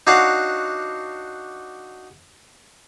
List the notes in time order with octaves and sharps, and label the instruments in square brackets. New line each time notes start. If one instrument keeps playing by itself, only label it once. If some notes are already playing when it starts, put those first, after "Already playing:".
[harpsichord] D4 D#4 F#4 C#5 F5 F#5